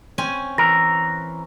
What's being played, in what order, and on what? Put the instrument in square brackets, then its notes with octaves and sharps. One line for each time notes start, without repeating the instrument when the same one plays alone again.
[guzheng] C4 C#4 G#5
[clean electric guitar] E3 A#4 [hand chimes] A#6